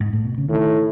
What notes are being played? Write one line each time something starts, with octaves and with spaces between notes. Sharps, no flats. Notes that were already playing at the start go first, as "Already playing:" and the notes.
G#2
A2
B2
C#3
A2 D#3